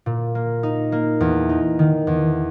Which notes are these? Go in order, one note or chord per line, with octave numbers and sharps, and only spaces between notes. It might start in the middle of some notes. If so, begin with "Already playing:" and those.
A#2
A#3
D#4
A#3
E2
D#4
D#3
E2